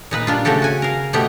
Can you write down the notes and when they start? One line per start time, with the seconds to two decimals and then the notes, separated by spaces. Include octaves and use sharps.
0.11 A#2 D#4 B4
0.27 G3 D4 F4
0.45 C#3 A3 F#4 G4 A4
0.62 F#4 G#5
0.82 A#4 F5
1.13 B2 A3 B3 G4